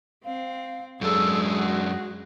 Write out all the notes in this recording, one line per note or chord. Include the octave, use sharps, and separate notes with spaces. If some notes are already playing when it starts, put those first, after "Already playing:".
C4 F5
F#2 F#3 G#3 D4 G#4 A4
F#4